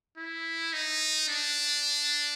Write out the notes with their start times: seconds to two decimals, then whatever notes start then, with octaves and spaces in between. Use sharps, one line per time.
0.18 E4
0.73 D#4
1.29 D4